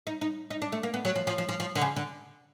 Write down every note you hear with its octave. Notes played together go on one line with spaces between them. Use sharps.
D#4
D#4
D#4
D4
A3
A#3
B3
F#3
F3
F3
F3
F3
F3
D3
C#3
D3